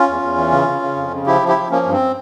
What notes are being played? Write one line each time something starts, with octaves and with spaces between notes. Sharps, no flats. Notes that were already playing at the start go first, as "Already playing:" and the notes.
Already playing: C#4 F4
E2
E2
E3
C#3
C#3
C#3
F2
C#3
F3 E4 G4
F3
E4 G4
F3
F3 A#3 C#4
G2
C4